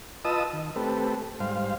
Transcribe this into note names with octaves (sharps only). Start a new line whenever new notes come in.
F4 B4 D#5 A5 D#6 E6
D#3
A3 C4 G4 A4 B4
G#2 G3 C5 F5